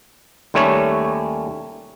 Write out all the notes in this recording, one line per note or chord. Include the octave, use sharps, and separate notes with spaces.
D#2 G3 A3 C#4 C#5